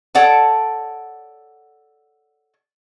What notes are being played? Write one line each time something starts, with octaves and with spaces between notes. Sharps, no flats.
A4 C#5 D5 F#5 A5